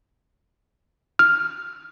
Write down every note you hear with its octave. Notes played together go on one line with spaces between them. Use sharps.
F6